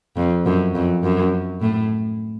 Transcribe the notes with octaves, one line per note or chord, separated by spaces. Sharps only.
F2
F#2
F2
F#2
A2